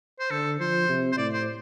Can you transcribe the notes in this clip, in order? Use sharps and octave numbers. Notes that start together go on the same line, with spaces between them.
C5
D3 A4
F3 C5
C3
C5
A2 D5
C5